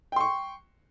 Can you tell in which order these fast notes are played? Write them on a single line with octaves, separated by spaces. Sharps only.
G5 C6 C#6